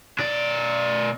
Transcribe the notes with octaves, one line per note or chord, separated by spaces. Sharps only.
B2 D5